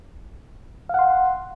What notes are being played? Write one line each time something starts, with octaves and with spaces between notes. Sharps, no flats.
F5 F#5 C6